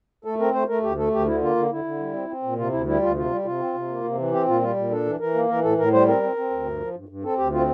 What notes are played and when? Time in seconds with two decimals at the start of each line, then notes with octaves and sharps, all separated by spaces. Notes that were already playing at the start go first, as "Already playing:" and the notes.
0.25 A3 A4
0.40 C4 A#4
0.54 A3 C5
0.68 A3 A#4
0.83 D2 G4
0.98 A3 A4
1.12 D2 G4
1.26 D3 E4
1.42 A#3 F4
1.56 D3
1.71 D3 E4
1.84 D3
1.99 G3
2.14 C4
2.29 C4
2.43 A#2
2.58 C3 F4
2.72 D2 E4
2.86 G3 E4
3.02 D2 F4
3.15 C3 F4
3.31 G3
3.45 C3 F4
3.60 C4
3.75 C3
3.89 A#3
4.04 C3
4.18 E3
4.32 C4 G4
4.47 A#2 F4
4.61 G3 F4
4.76 A#2
4.91 D4 A4
5.06 E3
5.20 E3 A#4
5.34 A#3
5.49 E3 A#4
5.63 A2 A4
5.78 A2 A#4
5.93 G3 C5
6.07 C4 A#4
6.22 C4
6.36 C4
6.50 D2
6.65 G2
6.80 F3
6.95 G2
7.09 G2
7.23 C4 A4
7.38 D2 G4
7.52 C4 F4